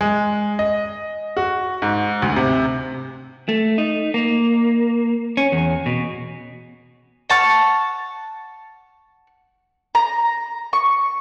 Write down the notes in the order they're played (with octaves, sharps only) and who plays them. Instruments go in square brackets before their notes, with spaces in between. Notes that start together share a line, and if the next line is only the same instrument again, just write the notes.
[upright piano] G#3
D#5
F#4
G#2
D2
C3
[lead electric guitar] A3
D#4
A#3
C#4
E2
B2
[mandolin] F#5 A5 C#6 F6
A#5
C#6